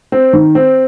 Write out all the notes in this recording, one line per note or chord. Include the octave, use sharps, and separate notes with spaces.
C4
D#3
C4